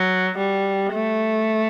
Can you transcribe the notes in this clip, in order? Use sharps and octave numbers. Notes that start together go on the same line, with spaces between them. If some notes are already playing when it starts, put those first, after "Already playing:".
Already playing: F#3
G3
A3